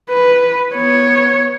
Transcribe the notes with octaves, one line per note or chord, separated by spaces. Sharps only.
B4
B3 C#5